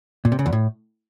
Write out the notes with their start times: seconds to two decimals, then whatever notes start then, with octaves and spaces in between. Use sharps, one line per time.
0.25 A#2
0.32 C3
0.39 C#3
0.46 E2
0.53 A2